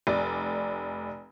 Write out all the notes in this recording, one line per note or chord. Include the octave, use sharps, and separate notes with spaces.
F1 D5